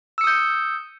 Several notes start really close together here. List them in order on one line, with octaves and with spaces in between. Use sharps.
E6 C#7 D#6 G6